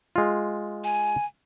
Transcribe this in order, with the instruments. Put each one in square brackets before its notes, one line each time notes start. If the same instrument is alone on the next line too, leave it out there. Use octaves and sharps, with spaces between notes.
[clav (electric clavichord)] G#3 F4
[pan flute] G#5